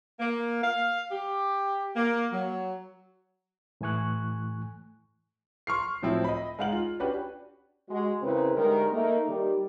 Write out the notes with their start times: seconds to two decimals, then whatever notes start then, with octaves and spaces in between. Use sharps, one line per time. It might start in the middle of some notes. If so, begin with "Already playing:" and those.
0.20 A#3
0.63 F5
1.12 G4
1.96 A#3
2.33 F#3
3.81 A2 E3 A3 G#5 C#6 F#6
5.67 C6 C#6 F6 C7
6.03 A2 F3 F#3 C4 E4
6.24 D#5 B5
6.59 G#3 D#4 F5 F#5 F#7
6.72 F4
7.00 C#4 D4 F#4 G4 B4
7.89 G#3 F#4
8.22 E2 C#3 C4 E4 A#4 B4
8.55 D2 D#3 G3 G#3 A#4
8.92 A3 A#3 D#4
9.28 D#3 G3